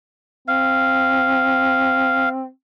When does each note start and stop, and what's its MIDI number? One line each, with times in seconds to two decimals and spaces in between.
0.48 2.48 60
0.48 2.29 77